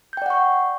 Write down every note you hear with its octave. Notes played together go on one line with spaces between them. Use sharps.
D5 F#5 G5 C#6 G6